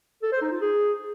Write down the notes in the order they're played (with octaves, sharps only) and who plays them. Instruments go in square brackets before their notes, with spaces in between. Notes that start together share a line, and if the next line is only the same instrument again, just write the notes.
[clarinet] A4
C5
D#4
F4
G#4